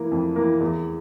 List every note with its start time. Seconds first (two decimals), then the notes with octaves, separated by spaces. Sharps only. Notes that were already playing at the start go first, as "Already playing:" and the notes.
Already playing: E3 A#3
0.11 F2
0.36 E3 A#3
0.60 E2